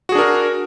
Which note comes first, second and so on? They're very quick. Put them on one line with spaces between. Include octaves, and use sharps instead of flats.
F#4 G#4 D4 A#4